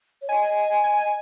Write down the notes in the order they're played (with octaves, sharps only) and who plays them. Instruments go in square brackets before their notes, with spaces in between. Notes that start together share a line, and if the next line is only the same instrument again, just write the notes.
[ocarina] C#5
[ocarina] D#5 [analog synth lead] G#5
[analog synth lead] G#5